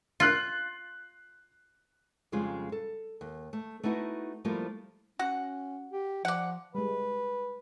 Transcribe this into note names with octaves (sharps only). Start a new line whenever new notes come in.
F4 F#6 C7
F2 C#3 G3 G#3 F4
A4
D#2
A3
A3 B3 D#4 E4 F#4
F3 G3 A3 A#3 E4 F4
C#4 F#4 F#5
G4
F3 D5 F#5
G3 G#3 B4